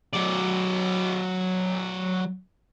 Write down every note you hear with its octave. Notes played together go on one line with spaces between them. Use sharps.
F#3 D5